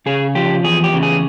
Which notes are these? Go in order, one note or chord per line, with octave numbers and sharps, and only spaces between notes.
C#3 G#4
F3 G4
E2 G#4
G4
C#3
G#4